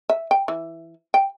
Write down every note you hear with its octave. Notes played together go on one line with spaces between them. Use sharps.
E5
G5
E3
G5